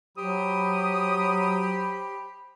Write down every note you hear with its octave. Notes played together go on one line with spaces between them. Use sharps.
F#3 G4 C5 B5 D#6